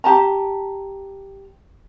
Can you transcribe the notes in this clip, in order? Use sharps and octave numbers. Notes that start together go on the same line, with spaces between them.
G4 A5 A#5